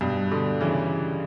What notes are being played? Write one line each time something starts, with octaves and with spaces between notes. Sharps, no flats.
G2 B2
B2 D3
C#3 E3